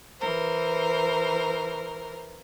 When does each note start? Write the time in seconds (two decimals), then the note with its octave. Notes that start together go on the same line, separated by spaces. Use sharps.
0.19 E3 A#4 C5